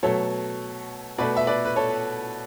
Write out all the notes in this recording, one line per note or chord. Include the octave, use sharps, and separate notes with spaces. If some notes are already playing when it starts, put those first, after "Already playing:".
B2 F#3 A3 A4 C#5
B2 A3 B4 D5
E5
B4 D5
B4
A4 C#5